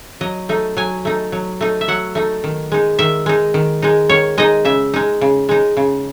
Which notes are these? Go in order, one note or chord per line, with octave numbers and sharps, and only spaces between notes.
F#3 D#5
A3 D#4
F#3 G#5
A3 D#4
F#3
A3 D#4
E5
F#3 F#5
A3 D#4
D#3
G#3 D#4
D#3 E5
G#3 D#4
D#3
G#3 D#4
D#3 C#5
G#3 D#4 D#5
C#3 E5
G#3 D#4
C#3
G#3 D#4
C#3